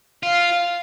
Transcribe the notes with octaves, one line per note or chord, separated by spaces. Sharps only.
F4 F5